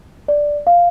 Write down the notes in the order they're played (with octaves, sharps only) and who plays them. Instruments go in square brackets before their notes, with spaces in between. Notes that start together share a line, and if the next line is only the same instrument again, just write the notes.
[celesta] D5
F5